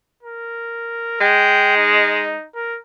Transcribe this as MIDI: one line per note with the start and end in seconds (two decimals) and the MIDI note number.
0.23 1.16 70
1.20 2.34 56
1.20 1.71 79
1.76 2.45 63
2.55 2.78 70